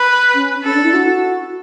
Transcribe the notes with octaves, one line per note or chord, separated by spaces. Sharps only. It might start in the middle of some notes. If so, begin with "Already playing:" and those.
Already playing: B4
C#4
C#4 A4
D4
E4
F#4